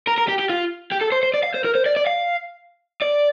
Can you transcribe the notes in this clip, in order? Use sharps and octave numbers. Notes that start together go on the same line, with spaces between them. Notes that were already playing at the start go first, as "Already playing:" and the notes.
A#4
A#4
G4
G4
F4
G4
A4
C5
C5
D5
F5
C5
A#4
C5
D5
D5
F5
D5